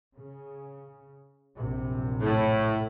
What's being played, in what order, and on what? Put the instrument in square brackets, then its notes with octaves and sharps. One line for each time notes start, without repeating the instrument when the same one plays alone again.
[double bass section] C#3
A#1 F#2 C3
[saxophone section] A2